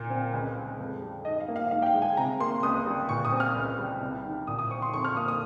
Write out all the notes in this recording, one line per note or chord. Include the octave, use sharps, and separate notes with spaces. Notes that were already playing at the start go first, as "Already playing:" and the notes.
Already playing: A#2
C4
C#2
G#3
F2
G3
G#2 D#5
F5
A#3
F5
G#2 F5
G5
F5
G#3
G#5
C3 A#5
A#3 C6
C#2 D#6
G3
A#2 C#6
D#6
C4
F6
C#2
G3
C2
D#3
A#2 D#6
D#6
C4 C#6
C6
F2 C#6
F6
A#3 D#6
D#6